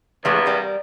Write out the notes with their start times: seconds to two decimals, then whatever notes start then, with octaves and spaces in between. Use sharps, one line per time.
0.25 E2 G2 C3 E3 G#3 A3
0.46 G3 A#4